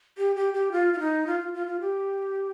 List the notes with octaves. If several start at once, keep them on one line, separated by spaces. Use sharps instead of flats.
G4
G4
G4
F4
F4
D#4
F4
F4
F4
F4
G4